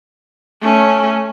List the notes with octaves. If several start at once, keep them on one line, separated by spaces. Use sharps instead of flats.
A3 C#4